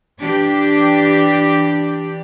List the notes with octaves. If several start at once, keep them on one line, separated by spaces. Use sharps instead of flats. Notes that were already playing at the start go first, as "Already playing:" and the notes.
E3 D4 G4